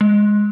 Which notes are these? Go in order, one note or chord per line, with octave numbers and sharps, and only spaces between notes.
G#3